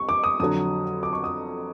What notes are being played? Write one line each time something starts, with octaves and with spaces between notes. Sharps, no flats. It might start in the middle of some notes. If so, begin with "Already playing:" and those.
Already playing: C2 C#6
D6
D#6
F2 D3 F#3 D#6
D6
C#6
D#6